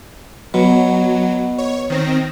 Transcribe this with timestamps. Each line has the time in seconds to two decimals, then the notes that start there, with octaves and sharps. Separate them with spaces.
0.54 B2 F#3
1.58 C#5
1.90 D#3 C4 A#6